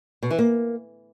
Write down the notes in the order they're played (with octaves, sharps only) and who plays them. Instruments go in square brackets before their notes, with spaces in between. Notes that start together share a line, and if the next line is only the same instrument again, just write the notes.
[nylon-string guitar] B2
E3
A#3